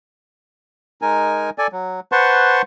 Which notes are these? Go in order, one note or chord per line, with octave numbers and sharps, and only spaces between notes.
G#3 D#4 A#4 G#5
A4 D5 G#5
F#3
B4 C5 F#5 A5 C6 C#6